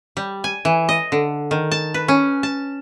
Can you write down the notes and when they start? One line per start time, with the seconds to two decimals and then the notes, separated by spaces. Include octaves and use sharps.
0.17 G3
0.44 G#5
0.65 E3
0.89 D#5
1.12 D3
1.51 D#3
1.72 A5
1.94 B4
2.08 C#4
2.43 A5